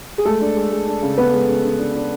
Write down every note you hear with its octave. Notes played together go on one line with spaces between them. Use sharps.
G#4
G#3 A3 A4
D4
G#3
G#3
D4
C#3
C#3 B3 B4
G#3
C#3
C#3
D4
D4